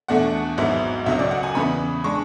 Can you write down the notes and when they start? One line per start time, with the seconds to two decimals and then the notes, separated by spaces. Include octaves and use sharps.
0.08 E2 B2 A3 D4 F#5
0.58 G#1 G#2 F#3 B3 E4
1.06 C#2 C#3 F#3 C#4 E5
1.19 D5
1.31 F#5
1.43 G#5
1.55 E2 C#3 E3 B3 B5
2.04 G#3 D4 C#6